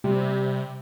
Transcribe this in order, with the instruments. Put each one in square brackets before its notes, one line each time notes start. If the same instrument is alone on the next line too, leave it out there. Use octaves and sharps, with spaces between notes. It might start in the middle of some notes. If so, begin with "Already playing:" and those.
[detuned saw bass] C3 [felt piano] G3